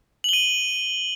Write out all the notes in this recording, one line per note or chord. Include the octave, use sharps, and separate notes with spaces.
D#7 F#7 G7